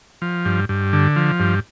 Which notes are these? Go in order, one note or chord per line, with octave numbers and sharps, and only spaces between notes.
F3
G2
G2
D3
F3
G2